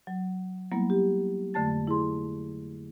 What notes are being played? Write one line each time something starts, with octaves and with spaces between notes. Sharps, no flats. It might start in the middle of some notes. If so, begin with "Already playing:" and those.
F#3
F#3 G3 A#3 B3 E4
G4
F2 D3 A3 A5 A6
E4 G#4 C6